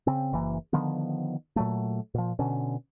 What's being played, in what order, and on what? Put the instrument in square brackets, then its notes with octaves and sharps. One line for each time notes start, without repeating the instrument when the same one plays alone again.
[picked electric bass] C#3 C4
F#1 E3 A#3
D3 D#3 F3 B3
A#2 F#3 A3
A#2 F3
B2 D3 C#4